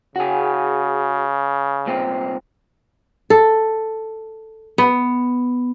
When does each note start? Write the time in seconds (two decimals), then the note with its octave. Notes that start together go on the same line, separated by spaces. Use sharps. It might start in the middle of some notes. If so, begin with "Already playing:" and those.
0.16 C#3 F#4 G#4
1.86 C2 A#2 C4
3.30 A4
4.78 B3